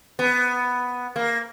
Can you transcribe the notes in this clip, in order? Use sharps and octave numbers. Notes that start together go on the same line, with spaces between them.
B3
A#3